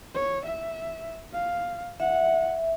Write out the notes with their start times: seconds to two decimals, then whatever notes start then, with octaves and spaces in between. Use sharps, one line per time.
0.14 C#5
0.45 E5
1.33 F5
2.00 E5 F#5